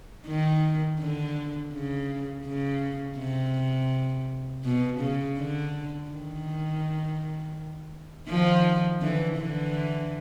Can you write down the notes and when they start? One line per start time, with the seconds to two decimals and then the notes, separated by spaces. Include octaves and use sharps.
0.28 D#3
1.00 D3
1.73 C#3
2.46 C#3
3.18 C3
4.64 B2
5.00 C#3
5.37 D3
6.11 D#3
8.29 D#3 F3
9.01 D3 E3
9.37 D3 E3